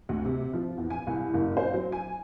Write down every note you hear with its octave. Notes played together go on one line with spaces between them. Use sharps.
D2
C3
F3
E2
G#5
C2
F#1
C5
F#3
G#5